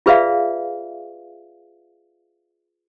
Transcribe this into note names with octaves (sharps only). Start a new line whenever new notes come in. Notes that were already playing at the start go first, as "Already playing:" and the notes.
F4 G#4 B4 D5 E5 F5